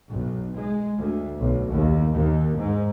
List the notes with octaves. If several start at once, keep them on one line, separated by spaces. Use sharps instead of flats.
B1
G#3
D2
B1
D#2
D#2
G#2